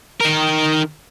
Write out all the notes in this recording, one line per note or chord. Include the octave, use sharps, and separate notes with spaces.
D#3 A#4